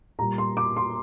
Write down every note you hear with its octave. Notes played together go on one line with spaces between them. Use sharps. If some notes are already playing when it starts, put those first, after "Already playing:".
A#2 G3 A#5
C6
D6
C6